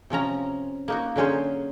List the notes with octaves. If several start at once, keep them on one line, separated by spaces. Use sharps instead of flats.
C3 F3 C#4 A#5
A#3 D#4 F#4
D3 F#3 C#4 G#4 C5